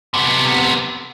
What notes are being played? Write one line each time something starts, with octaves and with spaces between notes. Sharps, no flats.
C3 B3